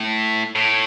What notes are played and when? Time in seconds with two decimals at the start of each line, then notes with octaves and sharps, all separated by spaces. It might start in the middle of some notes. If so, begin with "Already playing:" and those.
Already playing: A2
0.56 A2